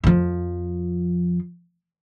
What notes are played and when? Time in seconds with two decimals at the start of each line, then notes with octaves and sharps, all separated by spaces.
0.04 F2 F3